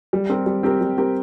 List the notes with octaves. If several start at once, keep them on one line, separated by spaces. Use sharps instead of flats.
G3
C4 G4 A#4
G3
C4 G4 A#4
G3
C4 G4 A#4